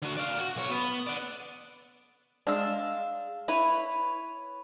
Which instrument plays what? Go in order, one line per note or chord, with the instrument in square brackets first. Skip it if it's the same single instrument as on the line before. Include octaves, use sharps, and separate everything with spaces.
[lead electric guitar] D3 F#4
D5 F5
F#4
B1 C#5
B3
D5 F#5
[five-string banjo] G#3 D4 [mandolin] F5 E6
[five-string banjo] E4 [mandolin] B4 C#5